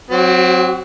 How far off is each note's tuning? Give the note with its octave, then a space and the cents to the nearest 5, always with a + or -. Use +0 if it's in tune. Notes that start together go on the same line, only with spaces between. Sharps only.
F#3 -15 C4 +0 F#4 +30